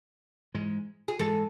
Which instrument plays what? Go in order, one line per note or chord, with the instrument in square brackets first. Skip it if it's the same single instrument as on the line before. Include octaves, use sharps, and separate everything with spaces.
[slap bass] G#2 E3 G#3
[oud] G#4
[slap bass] G#2 E3 G#3 [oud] A4